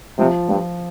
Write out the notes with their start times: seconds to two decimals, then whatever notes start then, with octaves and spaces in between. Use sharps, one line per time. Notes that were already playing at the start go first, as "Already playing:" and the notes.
0.18 C3 F3
0.48 G2 F3